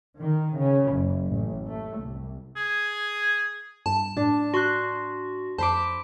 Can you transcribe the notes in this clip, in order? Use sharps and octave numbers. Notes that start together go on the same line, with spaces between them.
D#3
C#3
F#1
A1
A3
C2
G#4
G2 A5
A2 D4
F#4 C6 F#6
F2 C5 A5 B5 D6